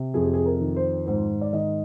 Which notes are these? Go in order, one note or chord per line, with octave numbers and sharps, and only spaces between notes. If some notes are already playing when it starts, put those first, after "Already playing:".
Already playing: C3
F2 G#4
G4
G#4
A#4
D#3
C5
G#2 C5
D5
D#3 D#5